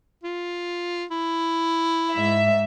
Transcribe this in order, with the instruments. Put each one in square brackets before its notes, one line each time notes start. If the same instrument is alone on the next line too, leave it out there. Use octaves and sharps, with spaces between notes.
[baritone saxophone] F4
E4
[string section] G#2 E5